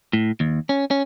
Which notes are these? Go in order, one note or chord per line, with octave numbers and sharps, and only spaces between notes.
A2
D#2
C#4
C#4